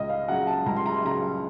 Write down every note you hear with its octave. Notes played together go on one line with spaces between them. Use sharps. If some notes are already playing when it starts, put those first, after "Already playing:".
Already playing: C#2 D#5
F5
C#3 F#3 F#5
A5
C#2 A#5
C6
A#5
C6
C#3 F#3 A#5